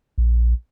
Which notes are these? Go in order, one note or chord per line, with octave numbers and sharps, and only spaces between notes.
A#1